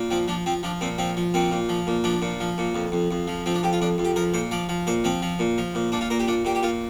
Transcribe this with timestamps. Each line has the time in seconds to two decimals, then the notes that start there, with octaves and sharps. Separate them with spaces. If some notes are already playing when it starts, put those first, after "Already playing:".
Already playing: A#2
0.11 F3 C4
0.28 F3 D4
0.46 F3 C4
0.63 F3 D4
0.81 A#2 C4
0.98 F3 C4
1.17 F3
1.34 A#2 C4
1.51 A#2
1.69 F3
1.87 A#2
2.04 F3 D4
2.22 A#2
2.40 F3
2.58 A#2
2.75 F2
2.92 F2
3.11 F2
3.27 F3
3.46 F3 C4
3.54 D4
3.63 F2 G4
3.73 F4
3.81 F2 D4
3.98 F2
4.05 G4
4.16 F3 A#4
4.34 A#2 C5
4.51 F3 D5
4.69 F3
4.87 A#2 C5
5.04 F3 C4
5.22 F3
5.39 A#2
5.58 F3
5.75 A#2
5.92 A#2 D4
6.01 F4
6.10 A#2 A#4
6.19 G4
6.27 A#2 D4
6.45 A#2 G4
6.55 G4
6.63 A#2 F4